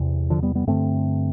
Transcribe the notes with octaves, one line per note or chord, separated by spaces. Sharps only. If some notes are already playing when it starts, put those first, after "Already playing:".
Already playing: E2 C3
D3 F3
G3 B3
G3 B3
G2 D3 A3 C4